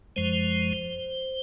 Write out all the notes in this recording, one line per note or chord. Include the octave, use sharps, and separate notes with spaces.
F#2 F3 G#3 C5